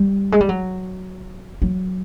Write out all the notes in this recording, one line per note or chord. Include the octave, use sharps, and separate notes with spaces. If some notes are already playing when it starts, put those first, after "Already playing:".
Already playing: G3
G#3
G3
F#3
F#3